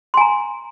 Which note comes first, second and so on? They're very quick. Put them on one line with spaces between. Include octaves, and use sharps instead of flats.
C6 G#5 A#5